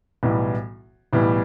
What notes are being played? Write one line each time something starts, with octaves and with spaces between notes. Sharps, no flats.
B1 A2 E3 G3 B3
B1 A2 E3 G3 B3